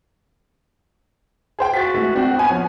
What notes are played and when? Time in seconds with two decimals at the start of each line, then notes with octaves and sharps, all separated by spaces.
1.59 G#4 C5 G5
1.74 F#4 A6 B6
1.94 E3 G#3 A3
2.15 C4 D4 F#4
2.35 B3 F#4 G#5
2.50 F3 C#4